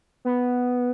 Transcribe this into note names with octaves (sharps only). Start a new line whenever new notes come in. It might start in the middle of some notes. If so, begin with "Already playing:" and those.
B3